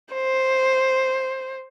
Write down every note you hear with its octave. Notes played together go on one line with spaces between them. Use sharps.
C5